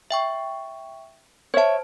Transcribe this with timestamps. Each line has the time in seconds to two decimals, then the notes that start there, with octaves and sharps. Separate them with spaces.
0.11 E5 G5 C#6
1.54 C5 C#5 E5 A5